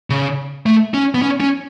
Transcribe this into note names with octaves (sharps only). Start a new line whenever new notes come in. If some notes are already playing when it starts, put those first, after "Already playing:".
C#3
A3
C#4
B3
C#4
C#4